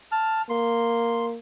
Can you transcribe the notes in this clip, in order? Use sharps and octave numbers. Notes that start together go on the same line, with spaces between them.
A5 F6
A#3 C6